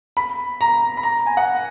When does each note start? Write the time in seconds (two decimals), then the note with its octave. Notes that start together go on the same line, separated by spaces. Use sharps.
0.17 B5
0.61 A#5
0.97 B5
1.03 A#5
1.26 G#5
1.37 F#5